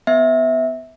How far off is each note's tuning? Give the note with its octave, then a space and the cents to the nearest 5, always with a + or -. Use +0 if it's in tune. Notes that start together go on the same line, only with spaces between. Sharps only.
B3 +10 E5 -20